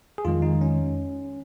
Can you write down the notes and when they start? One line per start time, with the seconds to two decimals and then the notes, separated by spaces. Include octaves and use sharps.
0.18 G#4
0.25 F2 D#3 G#3 F4
0.42 D#4
0.61 C#4